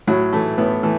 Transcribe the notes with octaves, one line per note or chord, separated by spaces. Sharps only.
A2 F#3
E3 A3
A2 B3
E3 A3